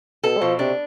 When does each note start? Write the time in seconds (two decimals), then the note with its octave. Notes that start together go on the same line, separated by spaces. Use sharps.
0.24 B2 A4
0.37 G#3
0.42 B2 F3
0.59 C3 D4